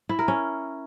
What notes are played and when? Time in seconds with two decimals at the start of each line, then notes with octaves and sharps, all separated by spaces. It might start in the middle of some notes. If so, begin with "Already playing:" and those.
0.09 E4
0.19 A#4
0.28 C#4